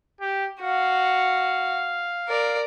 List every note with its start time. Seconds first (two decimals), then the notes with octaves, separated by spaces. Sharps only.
0.21 G4
0.60 F#4 F5
2.28 A#4 D5